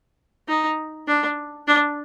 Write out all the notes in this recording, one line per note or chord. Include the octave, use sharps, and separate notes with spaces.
D#4
D4
D4